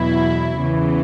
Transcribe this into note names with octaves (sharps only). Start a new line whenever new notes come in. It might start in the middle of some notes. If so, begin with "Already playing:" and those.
Already playing: E2 B2 F#3 E4
E2 C#3 E3